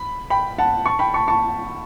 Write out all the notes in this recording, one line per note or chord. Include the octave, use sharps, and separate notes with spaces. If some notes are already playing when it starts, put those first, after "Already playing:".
Already playing: B5
G5 B5
F#5 A5
A5 C#6
G5 B5
A5 C#6
A5 C#6